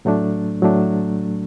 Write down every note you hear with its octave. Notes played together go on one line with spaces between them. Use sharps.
A2 F#3 A3 D4
A2 F#3 A3 D4